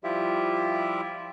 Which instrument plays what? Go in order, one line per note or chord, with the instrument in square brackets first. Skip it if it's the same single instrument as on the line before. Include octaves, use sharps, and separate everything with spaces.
[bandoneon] F3 G3 E4 F4 G4 E5